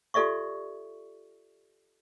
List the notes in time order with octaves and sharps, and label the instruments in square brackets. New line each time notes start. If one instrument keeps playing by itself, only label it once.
[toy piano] F4 G4 A4 D5 E5 C#6